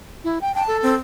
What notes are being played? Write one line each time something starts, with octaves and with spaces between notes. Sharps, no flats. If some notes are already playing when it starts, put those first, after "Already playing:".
E4
G5
G5 A5
A4
C4